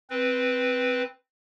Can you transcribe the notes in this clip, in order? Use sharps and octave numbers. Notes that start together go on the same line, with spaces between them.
C4 B4